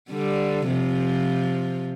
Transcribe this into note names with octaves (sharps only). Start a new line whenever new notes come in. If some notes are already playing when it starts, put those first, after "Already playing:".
D3 G3
C3 F3